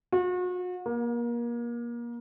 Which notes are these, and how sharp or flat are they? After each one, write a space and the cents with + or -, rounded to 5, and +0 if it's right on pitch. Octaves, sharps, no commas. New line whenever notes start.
F#4 -40
A#3 +30